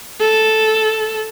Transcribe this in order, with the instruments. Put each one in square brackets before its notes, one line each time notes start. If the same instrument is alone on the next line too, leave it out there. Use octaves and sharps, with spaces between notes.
[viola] A4